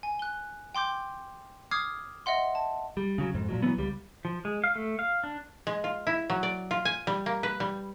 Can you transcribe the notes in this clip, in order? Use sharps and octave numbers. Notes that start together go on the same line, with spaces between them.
G#5
F#6 G7
G5 C6 D6 G6
D6 D#6 F6 G#6 C7
D#5 E5 F#5 C6
A5
G3
C#3 F#3
F2 G#2
A#2 F3 F#3
E3 F#3 A3 B3
C#2 G3
F3
G#3
F5
A3
F5
D4
G#3
F4
E4
F#3
D5
F4
G#5
G3
A#3
B4
G3